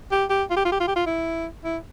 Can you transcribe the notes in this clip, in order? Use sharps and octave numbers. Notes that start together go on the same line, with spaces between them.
G4
G4
F4
G4
F4
G4
F4
G4
F4
E4
E4